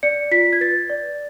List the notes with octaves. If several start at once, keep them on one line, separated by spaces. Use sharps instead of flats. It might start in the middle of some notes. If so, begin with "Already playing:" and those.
D5 C#7
F4 B6
G#6
B4 A6
D5